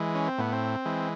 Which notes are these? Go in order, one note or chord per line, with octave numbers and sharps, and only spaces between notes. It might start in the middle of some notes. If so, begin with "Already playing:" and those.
Already playing: E3 G#3
C#4
C4
A2 B3
C4
E3 G#3